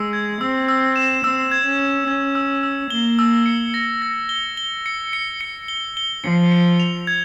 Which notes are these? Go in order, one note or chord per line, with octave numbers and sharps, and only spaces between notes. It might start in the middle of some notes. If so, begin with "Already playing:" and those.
Already playing: G#3 E6
G#6
C4 E6
E6
E7
C4 E6
G#6
C#4
G#6
C#4 G#6
E6
E6
A#3 G7
E6
C#7
A#6
A#6
G7
G7
C#7
C#7
C#7
G7
G7
F3 C#7
C#7
F7
G#6